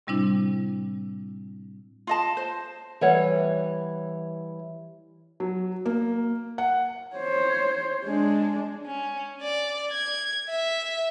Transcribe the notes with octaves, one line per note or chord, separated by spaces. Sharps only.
A2 C3 G3 C4 D4 E4
F4 D#5 A5
C5
E3 G3 C#5 F#5
F#3
A#3
F#5
C5 C#5
G#3 D4
C#4
D5
G#6
E5